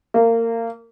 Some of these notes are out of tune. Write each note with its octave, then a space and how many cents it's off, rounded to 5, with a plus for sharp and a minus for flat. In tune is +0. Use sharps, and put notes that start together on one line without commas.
A#3 -25